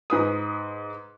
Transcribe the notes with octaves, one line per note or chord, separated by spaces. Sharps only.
G#2 B4 D#6